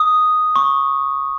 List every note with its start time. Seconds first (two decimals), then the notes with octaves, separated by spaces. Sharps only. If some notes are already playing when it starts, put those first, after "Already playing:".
Already playing: D#6
0.56 C#6